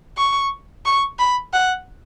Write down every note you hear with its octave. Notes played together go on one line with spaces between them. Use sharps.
C#6
C#6
B5
F#5